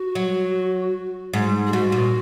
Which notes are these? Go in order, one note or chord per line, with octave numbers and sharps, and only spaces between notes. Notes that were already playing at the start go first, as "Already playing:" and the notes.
Already playing: F#4
F#3
G#2
G#4
G#2 F#4
A#2